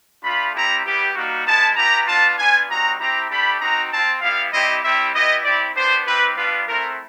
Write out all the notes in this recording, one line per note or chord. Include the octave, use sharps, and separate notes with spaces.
A3 D4 F4 B5
G3 C4 E4 G4 A#5
G3 B3 E4 G4
G3 A#3 D#4 F#4
G#3 B3 E4 A5
B3 E4 G4 A#5
B3 D4 F4 A5
B3 D4 F4 G#5
G3 C4 D#4 F#4 A#5
C4 E4 G4 A#5
A3 D4 G4 B5
C4 D#4 F#4 A#5
C4 F4 A5
G3 B3 E4 F5
G3 C4 E4 G4 D#5
G3 C4 E4 G4 E5
B3 E4 G4 D#5
C4 E4 G4 D5
B3 D4 G4 C5
G3 C4 E4 G4 B4
G3 B3 D4 F4 B4
A3 C4 E4 A#4